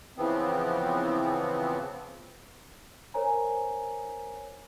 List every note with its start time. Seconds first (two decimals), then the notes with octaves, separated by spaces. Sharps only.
0.17 C#3 E3 F3 B3 C4
3.14 A#4 C5 C#5 G#5 A#5